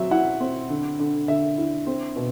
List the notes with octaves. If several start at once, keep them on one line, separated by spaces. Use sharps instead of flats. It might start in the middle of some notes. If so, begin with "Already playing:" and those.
Already playing: F#3 C4 E5
E4 F#5
C4
D3
D3
D3 E5
E4
C4
B2